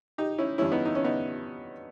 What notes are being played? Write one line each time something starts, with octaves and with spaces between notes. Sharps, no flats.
D#4 G4
C#4 E4
G2 E3 G3 C#4 E4
B3 D#4
D#4
C#4
B3 D#4